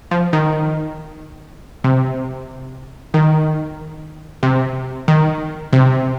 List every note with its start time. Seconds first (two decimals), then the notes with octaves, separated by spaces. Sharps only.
0.11 F3
0.33 D#3
1.84 C3
3.14 D#3
4.43 C3
5.08 D#3
5.73 C3